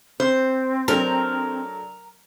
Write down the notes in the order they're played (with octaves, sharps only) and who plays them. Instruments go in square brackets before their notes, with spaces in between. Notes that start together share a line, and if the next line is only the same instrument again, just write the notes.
[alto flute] C4 [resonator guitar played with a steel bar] C5
[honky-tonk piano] F#3 A3 D4 [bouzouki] A#4